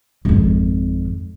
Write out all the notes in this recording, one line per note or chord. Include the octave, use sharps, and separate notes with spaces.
G#1 F2